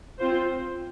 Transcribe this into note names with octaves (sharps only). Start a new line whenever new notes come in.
C4 F4 C5